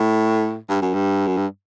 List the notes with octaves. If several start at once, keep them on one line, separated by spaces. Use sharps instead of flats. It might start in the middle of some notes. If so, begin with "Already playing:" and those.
Already playing: A2
G2
F#2
G2
F#2
G2